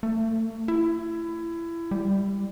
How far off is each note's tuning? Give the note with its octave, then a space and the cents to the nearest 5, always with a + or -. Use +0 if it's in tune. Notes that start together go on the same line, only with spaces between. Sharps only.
A3 +35
E4 +25
G3 +15